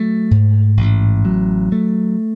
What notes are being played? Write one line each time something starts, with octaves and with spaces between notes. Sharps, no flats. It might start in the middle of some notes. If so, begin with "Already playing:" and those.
Already playing: F#3 A3
G#2
A1
F#3
A3